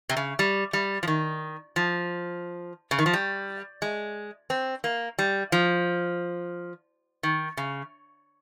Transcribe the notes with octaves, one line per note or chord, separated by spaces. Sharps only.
C3
C#3
G3
G3
F3
D#3
F3
C#3
D#3
F3
G3
G#3
C4
A#3
G3
F3
D#3
C#3